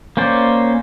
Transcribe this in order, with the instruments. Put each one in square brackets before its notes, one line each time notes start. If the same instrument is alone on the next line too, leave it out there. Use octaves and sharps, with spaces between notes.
[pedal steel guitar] A#3 C#4 C5 D5